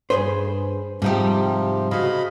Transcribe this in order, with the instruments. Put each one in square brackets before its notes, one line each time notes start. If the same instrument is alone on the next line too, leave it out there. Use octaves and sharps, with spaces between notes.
[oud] G2 G#4 B4 [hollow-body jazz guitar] C5
[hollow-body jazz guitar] G#2 [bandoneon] C3 F3 [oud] G3 D#4 G4
[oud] C#3 F#4 [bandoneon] D#5 F5 B5